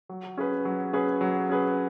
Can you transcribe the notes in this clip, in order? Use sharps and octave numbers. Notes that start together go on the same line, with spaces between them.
F#3
C#4 G#4 B4
F#3
C#4 G#4 B4
F#3
C#4 G#4 B4